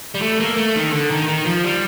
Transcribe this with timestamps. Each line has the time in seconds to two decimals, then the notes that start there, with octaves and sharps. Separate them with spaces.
0.15 G3
0.22 A3
0.40 A#3
0.57 A3
0.75 D#3
0.93 D3
1.10 D#3
1.28 D#3
1.46 F3
1.64 G3